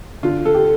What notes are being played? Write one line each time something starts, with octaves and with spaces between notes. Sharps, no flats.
D3 F4
A4
G4